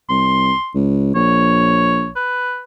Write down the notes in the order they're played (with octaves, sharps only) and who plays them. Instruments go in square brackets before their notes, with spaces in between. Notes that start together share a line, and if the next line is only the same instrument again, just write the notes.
[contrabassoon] C2 [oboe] C6
[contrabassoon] C#2
[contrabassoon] A#1 [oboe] C#5
[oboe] B4